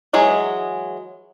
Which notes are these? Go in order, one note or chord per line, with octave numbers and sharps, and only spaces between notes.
E3 F#3 G#3 G#4